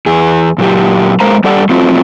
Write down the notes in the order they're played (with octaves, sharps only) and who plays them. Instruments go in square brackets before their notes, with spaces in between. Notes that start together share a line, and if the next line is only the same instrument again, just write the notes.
[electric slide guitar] E2 G#4
A#2 F#3 G4
G#3 A#4 C5 F5 A#5
G3 G4 A4 D5 F#5
F#3 A3 C4 F4